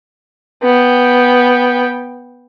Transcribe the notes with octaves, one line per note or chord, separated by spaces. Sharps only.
B3 G5